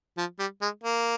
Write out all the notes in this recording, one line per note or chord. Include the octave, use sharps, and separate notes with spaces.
F3
G3
G#3
A#3